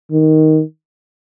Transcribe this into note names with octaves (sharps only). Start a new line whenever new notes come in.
D#3